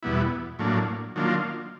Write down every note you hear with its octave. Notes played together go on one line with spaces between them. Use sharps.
E2 B2 G3 B3 E4
A2 F#3 A#3 D4
D#3 F#3 A#3 D4 F4